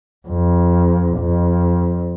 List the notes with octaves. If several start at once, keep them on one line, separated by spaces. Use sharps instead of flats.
F2
F2